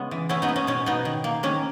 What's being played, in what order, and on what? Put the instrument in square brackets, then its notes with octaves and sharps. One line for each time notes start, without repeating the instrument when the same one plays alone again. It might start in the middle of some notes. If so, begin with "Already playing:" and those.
Already playing: [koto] C#3 G#3 B3 C#4
E3
B3 C#4 E4
B3 D#4
G#3
C#4
B2 C#4
B2 B3 D#4
D#3
A#3
D#3 C#4